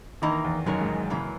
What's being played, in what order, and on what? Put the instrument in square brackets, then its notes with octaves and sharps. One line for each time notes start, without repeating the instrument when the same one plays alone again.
[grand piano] D#3 [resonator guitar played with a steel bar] E3 A#3 D#4
[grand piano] E2
[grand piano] F#2 [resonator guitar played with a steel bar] G#3 D#4 A#4 C#5
[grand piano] G#2
F#2
[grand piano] F#2 [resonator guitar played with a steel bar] C#3 E3 A#3